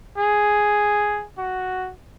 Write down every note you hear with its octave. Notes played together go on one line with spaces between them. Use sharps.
G#4
F#4